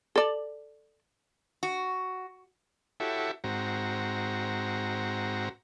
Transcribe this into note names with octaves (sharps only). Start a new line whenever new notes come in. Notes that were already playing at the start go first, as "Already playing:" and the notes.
A4 D5
F#4
E4 F#4 G4 A4 C#5 E5
G#2 C4 F#4 A#5